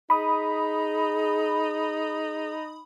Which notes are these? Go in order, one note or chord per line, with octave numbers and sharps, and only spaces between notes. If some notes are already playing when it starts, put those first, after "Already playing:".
D#4 G#4 B5 D#6